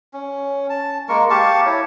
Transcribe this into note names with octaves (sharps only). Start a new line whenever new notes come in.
C#4
A5
G#3 A#3 A#4 C#6
G4 F5 A5 C#6
E4 C#5